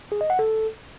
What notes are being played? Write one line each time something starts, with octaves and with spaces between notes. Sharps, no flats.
G#4
D#5
F#5
A4